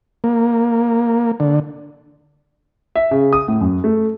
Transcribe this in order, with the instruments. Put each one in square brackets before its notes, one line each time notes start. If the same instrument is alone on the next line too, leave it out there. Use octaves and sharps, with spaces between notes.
[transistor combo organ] A#3
D3
[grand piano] E5
C#3
D#6
A2
F#2
A3